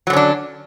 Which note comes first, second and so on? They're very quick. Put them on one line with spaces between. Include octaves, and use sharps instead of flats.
F#3 D3 C#4 D4